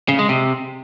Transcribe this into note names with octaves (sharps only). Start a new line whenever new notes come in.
C#3
G#3
C3